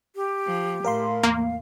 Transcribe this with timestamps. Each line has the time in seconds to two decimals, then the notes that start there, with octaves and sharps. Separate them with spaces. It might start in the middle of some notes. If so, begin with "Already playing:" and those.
0.16 G4
0.47 F3
0.84 A2 A#4 F5 C6
1.23 E2 A#3 F5